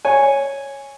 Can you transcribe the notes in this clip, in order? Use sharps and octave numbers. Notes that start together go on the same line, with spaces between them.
C#5 G#5